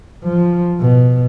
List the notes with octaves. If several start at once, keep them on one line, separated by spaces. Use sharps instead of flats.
F3
B2